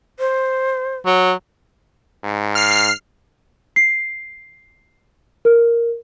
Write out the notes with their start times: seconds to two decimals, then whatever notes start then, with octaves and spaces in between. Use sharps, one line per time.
0.19 C5
1.07 F#3
2.24 G#2
2.55 F6 C7
3.76 C7
5.45 A#4